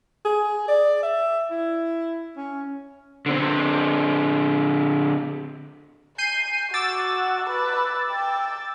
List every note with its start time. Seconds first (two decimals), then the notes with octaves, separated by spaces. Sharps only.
0.25 G#4
0.68 D5
1.02 E5
1.50 E4
2.36 C#4
3.26 D3 C4
6.18 G#5 G6 C7 D#7
6.74 F#4 D6 E6 A6
7.49 B4
8.11 G5